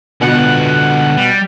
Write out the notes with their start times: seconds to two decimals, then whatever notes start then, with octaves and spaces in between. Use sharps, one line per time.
0.21 B2 D3 F4 F#5 F#6
1.17 G3